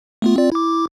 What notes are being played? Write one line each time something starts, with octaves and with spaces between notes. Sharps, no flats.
A3 B3 F4
C4 F4 D5
E4 D6